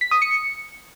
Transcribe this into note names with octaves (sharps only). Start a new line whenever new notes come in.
B6
D#6
C#7